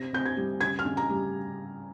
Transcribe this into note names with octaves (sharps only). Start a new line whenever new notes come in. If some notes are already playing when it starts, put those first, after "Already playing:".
Already playing: C3 A#6
C3 G6
G#6
G3
C#3 G#6
F6
C#3
A#5
G3